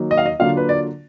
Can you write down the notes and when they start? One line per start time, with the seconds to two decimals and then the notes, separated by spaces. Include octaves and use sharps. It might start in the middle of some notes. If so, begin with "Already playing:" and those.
Already playing: D#3 F#3 A#3 D#4
0.11 D#5
0.17 F5
0.26 D#5
0.40 D3 F#3 A#3 D4 F4 F5
0.57 B4
0.69 D5